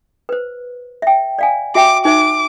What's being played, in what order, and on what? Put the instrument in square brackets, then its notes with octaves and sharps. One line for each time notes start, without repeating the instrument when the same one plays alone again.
[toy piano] B4 C5
E5 G5
D5 F5 G#5
[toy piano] F#4 E5 G5 [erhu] D6
[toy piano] D#4 C5 E5 [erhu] D6